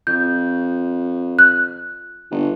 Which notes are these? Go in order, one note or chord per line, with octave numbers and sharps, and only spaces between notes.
F2 G6
F#6
G1